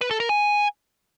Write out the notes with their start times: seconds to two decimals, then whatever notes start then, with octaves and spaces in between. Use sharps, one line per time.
0.01 B4
0.11 A4
0.20 A#4
0.29 G#5